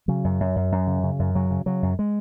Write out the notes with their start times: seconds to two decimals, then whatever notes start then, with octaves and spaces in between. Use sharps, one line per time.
0.08 C#3 F#3
0.24 F#2
0.40 F#2
0.56 F#2
0.72 F#2
0.87 C#3
1.04 C#3
1.19 F#2
1.35 C#3 F#3
1.51 C#3
1.66 C#3 F#3
1.83 F#2
1.99 G#3